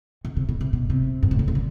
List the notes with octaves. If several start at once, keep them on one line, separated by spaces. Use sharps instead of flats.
B2
C3
B2
C3
B2
C3
G2
A2
B2
C3
D3